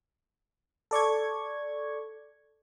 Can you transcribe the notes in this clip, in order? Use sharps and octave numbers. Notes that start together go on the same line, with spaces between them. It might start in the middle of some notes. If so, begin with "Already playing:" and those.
A4 D5 C#6 G#6